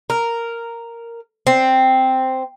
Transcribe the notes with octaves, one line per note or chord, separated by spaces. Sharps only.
A#4
C4